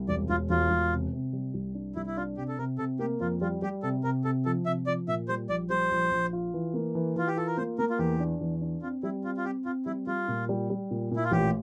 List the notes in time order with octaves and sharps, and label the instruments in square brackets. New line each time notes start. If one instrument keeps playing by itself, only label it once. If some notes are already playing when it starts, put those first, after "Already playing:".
Already playing: [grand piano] C2
[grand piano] E1 [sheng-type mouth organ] D5
[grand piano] E1 [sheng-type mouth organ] F4
[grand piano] E1 [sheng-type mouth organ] F4
[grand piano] E1
C3
C3
G3
C2
D4
[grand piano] C2 [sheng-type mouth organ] E4
[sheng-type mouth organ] E4
[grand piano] D4 [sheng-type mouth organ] F4
[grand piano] C3 [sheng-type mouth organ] G4
[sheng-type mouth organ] A4
[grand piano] C3 [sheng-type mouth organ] A#4
[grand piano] C3 [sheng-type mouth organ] A4
[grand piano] A#3 [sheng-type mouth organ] G4
[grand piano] F2 [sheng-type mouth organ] F4
[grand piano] G3 [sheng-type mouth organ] F4
[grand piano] G3 [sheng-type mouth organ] G4
[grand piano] C3 [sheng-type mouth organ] A4
[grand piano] C3 [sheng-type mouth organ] A#4
[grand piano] C3 [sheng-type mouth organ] A4
[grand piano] F3 [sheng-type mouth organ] A4
[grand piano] C3 [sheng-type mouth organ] E5
[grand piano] F3 [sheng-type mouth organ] D5
[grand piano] A#2 [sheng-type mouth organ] E5
[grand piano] G3 [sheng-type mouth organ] C5
[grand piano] A#1 [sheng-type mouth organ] D5
[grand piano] G3 [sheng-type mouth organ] C5
[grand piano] A#1
A#1
F4
E3
A#3
E3
[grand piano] E3 [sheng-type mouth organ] F4
[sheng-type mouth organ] G4
[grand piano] F4 [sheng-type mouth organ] A4
[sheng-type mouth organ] A#4
[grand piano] A#3 [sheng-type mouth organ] C5
[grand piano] A#3 [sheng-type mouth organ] A#4
[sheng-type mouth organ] F4
[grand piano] E2 [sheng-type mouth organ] G4
[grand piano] D4
E2
D4
[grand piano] C4 [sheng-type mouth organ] F4
[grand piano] G3 [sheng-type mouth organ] E4
[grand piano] C4 [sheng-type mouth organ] F4
[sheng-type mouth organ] F4
[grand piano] C4 [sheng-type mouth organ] G4
[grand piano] C4 [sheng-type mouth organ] F4
[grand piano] G3 [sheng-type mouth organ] E4
[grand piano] G3 [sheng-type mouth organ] F4
[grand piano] A#2
G3
G3
A#2
[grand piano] A#2 [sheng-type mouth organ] E4
[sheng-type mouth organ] F4
[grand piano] A1 [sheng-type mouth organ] G4